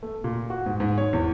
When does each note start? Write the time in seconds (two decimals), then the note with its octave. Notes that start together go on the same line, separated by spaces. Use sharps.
0.03 A3
0.24 A#2
0.50 F#4
0.66 G#2
0.80 G#2
0.98 C#5
1.13 E2